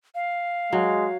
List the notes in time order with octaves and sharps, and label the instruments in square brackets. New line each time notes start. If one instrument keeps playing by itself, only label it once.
[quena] F5
[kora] F#3 [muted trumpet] G#3